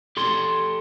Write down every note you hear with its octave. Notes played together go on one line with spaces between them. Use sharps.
G4 A4 C6